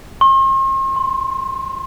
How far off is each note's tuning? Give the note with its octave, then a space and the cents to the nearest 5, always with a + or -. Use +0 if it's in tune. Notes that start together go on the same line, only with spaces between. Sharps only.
C6 +45
C6 +0